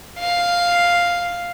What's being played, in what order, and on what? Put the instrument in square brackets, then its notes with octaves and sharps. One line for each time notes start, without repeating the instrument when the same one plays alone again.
[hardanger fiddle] F5